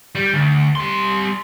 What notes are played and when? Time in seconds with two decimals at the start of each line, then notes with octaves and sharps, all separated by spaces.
0.15 G3
0.34 D2
0.75 G3 C6